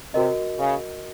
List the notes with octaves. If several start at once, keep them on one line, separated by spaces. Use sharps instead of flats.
C3 F#4 A#4 D#5
C#3